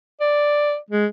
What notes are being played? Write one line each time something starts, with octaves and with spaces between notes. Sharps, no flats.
D5
G#3